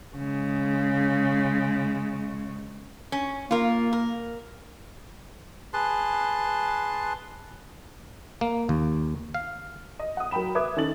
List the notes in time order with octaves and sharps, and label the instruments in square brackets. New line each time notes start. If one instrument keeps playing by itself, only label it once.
[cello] C#3 G#3
[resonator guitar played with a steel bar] C#4
[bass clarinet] A#3 [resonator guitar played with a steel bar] F4 A#4
[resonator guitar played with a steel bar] A#4
[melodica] G#4 B4 A5 C6
[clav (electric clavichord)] A#3
D#2
F5
[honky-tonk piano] D#5
F#5 D#6
F#3 A#4 G5 B5 E7
B4 E5 D6 D#6 G#6
D#3 C#4 A4 A6 F#7